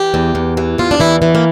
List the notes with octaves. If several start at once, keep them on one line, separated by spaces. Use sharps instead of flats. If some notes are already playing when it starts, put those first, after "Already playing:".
Already playing: E3 G4
E2
E2
E3
E2 F4
D4
E3 E4
E3
A#3